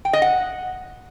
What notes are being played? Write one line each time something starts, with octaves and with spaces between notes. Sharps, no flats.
G5
D#5
F#5